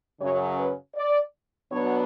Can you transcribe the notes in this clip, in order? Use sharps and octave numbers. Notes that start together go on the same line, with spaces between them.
F#2 C#3 F#3 C#4 C#5
B4
D5
B2 F#3 B3 D4 C#5